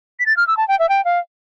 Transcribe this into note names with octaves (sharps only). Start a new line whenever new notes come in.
B6
A6
F6
E6
A5
G5
E5
G5
F5